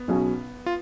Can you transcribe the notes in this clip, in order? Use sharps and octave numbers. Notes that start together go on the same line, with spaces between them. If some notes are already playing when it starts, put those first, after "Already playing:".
Already playing: B3
B1 B2 F#3 C#4 G#4
F4